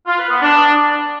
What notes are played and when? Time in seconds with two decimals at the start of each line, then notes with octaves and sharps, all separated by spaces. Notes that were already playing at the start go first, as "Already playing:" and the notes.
0.07 F4
0.18 B4
0.30 B3
0.42 D4